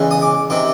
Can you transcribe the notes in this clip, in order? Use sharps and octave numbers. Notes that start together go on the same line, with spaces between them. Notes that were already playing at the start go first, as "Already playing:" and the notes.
Already playing: E2 C#3 E3 G#3
D#6
D6
C3 D#3 D6